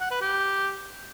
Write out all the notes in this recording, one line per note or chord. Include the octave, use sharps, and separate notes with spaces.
F#5
B4
G4